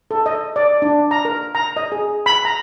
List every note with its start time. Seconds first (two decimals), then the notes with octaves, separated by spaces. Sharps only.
0.11 A4
0.26 D#5
0.56 D5
0.82 D4
1.11 A#5
1.25 A#4
1.55 A#5
1.77 D#5
1.92 G#4
2.26 B5
2.45 A#5